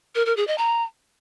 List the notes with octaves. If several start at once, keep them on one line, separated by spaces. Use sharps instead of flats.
A#4
A#4
G#4
D#5
A#5